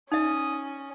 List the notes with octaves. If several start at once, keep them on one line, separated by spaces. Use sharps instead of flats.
C#4 D#4 E5 D#6